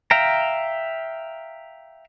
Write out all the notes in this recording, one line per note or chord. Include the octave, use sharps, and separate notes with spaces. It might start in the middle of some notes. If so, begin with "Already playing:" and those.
E5 F5 G5 A#5